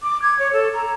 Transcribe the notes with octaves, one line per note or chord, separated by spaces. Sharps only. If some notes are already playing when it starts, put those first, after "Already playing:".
D6
G#6
C#5
A4
A#5